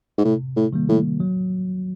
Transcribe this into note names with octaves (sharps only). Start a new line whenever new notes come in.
G#2
A2 C3
A2
D#3 G3 A#3
A2
F#3